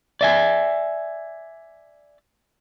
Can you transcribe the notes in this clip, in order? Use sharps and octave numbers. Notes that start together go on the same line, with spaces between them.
D5 E5 G#5